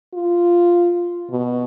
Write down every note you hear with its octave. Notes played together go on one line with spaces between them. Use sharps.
F4
B2